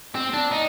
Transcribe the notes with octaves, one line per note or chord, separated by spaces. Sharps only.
C4
D4
D#4